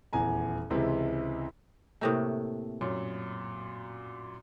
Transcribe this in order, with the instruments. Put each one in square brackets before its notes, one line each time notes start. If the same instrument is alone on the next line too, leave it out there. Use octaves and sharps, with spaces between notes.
[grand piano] D#1 E2 G#5 A#5
C#2 C3 E3 G#3 C4
[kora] A2 C3 A3 [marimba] A#3 A#4 D#6
[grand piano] F#2 A#2 [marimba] C#5